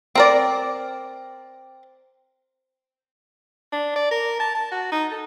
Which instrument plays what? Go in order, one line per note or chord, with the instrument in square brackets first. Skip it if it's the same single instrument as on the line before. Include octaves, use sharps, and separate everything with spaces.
[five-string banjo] C4 A#4 D5
[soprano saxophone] D4
D5
A#4
A5
A5
F#4
D#4
A4